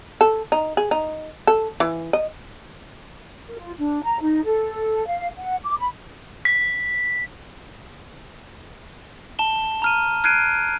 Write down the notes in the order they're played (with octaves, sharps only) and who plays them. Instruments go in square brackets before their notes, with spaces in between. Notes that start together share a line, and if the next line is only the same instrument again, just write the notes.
[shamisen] A4
D#4
G#4
D#4
A4
E3
D#5
[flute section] A#4
F4
D4
A#5
D#4
A4
F5
F#5
D6
B5
[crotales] B6
[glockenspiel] A5 E7 G7
A#5 F6 D#7
F6 F#6 G#6 C7 D7 D#7